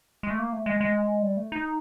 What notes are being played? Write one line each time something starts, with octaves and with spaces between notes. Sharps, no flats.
G#3
A3
A#3
A3
G#3
G#3
G3
A3
D#4